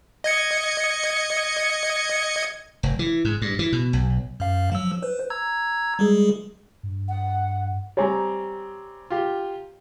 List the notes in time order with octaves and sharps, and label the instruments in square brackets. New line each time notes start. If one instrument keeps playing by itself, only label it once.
[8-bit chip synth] D#5 G#6 C#7
[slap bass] F1
E3
G#2
G2
E3
B2
B1
[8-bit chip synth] F#2 F5
F3 F#3 E6
B4 C5
A#5 E6 G#6
G3 G#3 G#4
[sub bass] G2
[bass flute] F#5
[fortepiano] G3 C4 [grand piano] C#5 G#5 A#5
[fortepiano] F4 G4